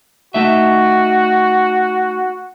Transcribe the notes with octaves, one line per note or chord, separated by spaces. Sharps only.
A3 D#4 F#4 E5